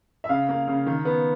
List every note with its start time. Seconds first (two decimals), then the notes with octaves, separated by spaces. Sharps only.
0.24 E5
0.29 C#3 F5
0.49 A#3
0.68 C#3
0.86 D#3
1.05 B3